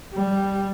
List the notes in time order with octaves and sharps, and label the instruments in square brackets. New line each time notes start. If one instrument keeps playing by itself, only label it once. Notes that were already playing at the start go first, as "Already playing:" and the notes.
[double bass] G3